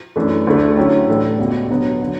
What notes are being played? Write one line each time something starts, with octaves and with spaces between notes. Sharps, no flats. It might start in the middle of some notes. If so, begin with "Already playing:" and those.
F#2 E3 A3 D4
D2 D3 A3 D4
D3 F#3 C#4 E4 G4
A2 E3 A3 D4 A4
C#2 B2 G3
D3 F#3 B3
D3 F#3